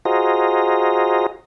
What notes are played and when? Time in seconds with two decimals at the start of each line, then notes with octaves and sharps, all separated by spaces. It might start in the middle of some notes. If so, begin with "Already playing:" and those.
0.05 F4 F#4 G#4 C5 D#5 A#5